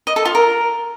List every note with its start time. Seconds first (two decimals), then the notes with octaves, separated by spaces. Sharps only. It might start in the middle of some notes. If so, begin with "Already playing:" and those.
0.07 D#5
0.16 A4
0.25 F4
0.35 A#4